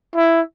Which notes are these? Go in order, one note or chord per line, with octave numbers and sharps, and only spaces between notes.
E4